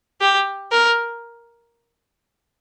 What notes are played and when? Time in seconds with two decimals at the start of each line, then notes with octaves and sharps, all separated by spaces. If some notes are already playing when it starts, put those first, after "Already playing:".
0.21 G4
0.72 A#4